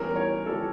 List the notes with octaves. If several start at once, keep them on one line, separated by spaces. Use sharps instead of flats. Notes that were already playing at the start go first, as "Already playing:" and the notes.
Already playing: E2 E3 G3 C#4 A#4
C#5
E3 G3 C#4 A4